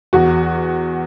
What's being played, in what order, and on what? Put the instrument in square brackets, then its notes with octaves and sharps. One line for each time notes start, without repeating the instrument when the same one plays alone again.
[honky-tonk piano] E2 F#4